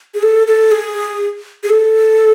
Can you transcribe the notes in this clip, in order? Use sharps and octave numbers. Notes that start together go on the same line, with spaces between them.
G#4
A4
A4
G#4
G#4
A4